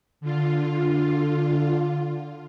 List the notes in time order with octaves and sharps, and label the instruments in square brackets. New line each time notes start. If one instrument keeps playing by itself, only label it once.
[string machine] D3 F4